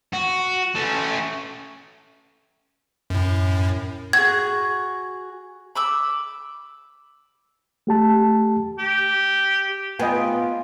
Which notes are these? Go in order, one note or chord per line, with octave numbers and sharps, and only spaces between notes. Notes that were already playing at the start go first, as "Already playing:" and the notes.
F#4
A3 C#4
F#2 A2
F#4 G#4 G#6
B5 D6 E6
A3 G4 A5
G4
B3 F4 D#5 G5 G#5